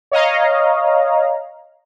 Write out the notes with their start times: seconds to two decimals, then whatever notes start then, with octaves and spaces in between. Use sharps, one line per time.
0.12 C#5 D#5 F5 A#5